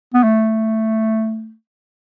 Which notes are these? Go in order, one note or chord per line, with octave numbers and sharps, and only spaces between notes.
B3
A3